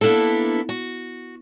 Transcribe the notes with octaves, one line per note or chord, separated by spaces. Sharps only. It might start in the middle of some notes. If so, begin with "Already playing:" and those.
A#3 B3 D4 E4 A4
F#4